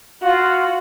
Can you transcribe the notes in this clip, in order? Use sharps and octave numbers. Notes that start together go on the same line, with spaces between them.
F4 F#4